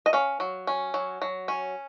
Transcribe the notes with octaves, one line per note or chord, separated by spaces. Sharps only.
D#5
C#4 F5
F#3
C#4
F#3
F#3
C#4